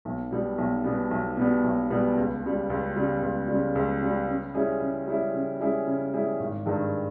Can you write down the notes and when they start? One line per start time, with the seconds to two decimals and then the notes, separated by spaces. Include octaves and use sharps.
0.05 B1
0.31 B2 G3 B3
0.58 B1
0.84 B2 G3 B3
1.11 B1
1.37 B2 G3 B3
1.64 B1
1.91 B2 G3 B3
2.17 C#2
2.43 C#3 G3
2.70 C#2
2.96 C#3 G3
3.22 C#2
3.48 C#3 G3
3.75 C#2
4.01 C#3 G3
4.28 C#3
4.54 G3 C#4 E4 G#4
4.81 C#3
5.07 G3 C#4 E4 G#4
5.34 C#3
5.60 G3 C#4 E4 G#4
5.87 C#3
6.13 G3 C#4 E4 G#4
6.40 G#1
6.66 G2 D#3 G#3